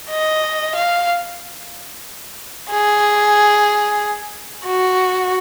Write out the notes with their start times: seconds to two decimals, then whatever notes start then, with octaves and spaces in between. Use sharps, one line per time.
0.10 D#5
0.75 F5
2.71 G#4
4.67 F#4